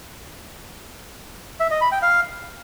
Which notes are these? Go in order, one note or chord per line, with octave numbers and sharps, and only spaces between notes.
E5
D#5
B5
G5
F5